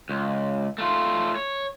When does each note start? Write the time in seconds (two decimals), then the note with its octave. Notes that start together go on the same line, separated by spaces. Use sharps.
0.09 C#2
0.78 A3 F4
1.36 C#5